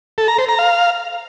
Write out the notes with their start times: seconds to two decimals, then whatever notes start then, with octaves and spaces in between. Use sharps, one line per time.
0.18 A4
0.28 A#5
0.38 C5
0.48 A#5
0.59 F5